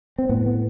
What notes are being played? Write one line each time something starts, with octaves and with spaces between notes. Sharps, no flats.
C4
A2 B3
B3